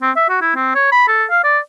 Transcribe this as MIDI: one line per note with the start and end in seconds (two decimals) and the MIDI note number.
0.02 0.11 60
0.16 0.25 76
0.29 0.38 66
0.41 0.55 64
0.55 0.70 60
0.75 0.90 73
0.92 1.07 83
1.08 1.24 69
1.30 1.39 77
1.44 1.59 74